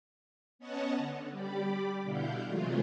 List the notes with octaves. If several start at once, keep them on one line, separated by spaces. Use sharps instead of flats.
B3 C#4 C#5 D#5 F#5 A5
D3
G3 G4 D5 B5 D6
B2 D3 E4 F5 F#5 G6
C3 E3 F#3 G#3 A3 F4